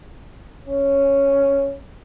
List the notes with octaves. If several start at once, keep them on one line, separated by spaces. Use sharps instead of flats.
C#4